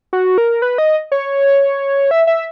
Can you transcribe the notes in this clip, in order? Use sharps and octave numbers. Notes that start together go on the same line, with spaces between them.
F#4
A#4
B4
D#5
C#5
E5
E5